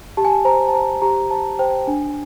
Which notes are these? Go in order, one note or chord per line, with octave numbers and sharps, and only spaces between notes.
G4 A5
G#5
A5
C5 A#5
A5
C5 A#5
G4 A#5
C5 A5
C5 G5
D4 G#5